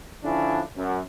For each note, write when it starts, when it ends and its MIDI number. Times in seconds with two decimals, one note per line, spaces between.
0.24 0.60 50
0.24 0.60 53
0.24 0.60 61
0.24 0.60 62
0.24 0.60 64
0.76 1.00 42